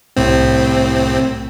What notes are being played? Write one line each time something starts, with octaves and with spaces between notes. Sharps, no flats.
C2 A2 C4